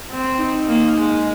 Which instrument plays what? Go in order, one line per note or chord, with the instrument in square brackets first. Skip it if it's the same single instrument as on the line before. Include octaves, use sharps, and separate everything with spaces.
[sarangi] C4
[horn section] D#4
[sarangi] A#3
G#3